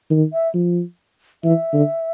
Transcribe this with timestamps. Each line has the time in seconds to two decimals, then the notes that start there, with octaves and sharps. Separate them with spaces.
0.10 D#3
0.33 E5
0.54 F3
1.44 E3 E5
1.73 D3